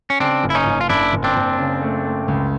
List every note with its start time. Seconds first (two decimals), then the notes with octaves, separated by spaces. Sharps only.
0.10 C#4
0.20 C#3 C4 D4
0.44 F#1
0.50 E4
0.55 C#4 D#4
0.66 F#1
0.81 F4
0.89 F#1 D4 E4
1.13 F#1
1.24 C4 D4
1.36 F#1
1.59 C#3
1.82 A3
2.05 A3
2.28 C#2